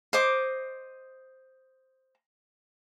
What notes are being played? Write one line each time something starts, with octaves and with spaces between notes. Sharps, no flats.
C5 D#5 D6